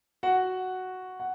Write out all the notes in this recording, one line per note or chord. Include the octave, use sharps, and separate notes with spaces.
F#4 F#5
F#5